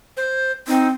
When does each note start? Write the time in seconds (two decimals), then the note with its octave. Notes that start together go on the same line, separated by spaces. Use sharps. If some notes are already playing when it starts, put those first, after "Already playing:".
0.17 C5
0.68 C4 D#4